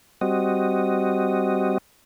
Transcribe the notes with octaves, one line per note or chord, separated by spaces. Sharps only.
G3 C4 F#4 D#5